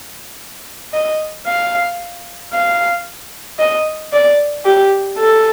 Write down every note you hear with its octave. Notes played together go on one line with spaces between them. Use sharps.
D#5
F5
F5
D#5
D5
G4
A4